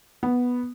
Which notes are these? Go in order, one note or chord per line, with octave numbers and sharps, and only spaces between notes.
B3